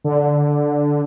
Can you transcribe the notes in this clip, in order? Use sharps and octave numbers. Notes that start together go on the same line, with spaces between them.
D3